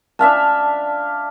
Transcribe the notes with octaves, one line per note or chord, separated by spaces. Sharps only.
D4 E5 F5 A5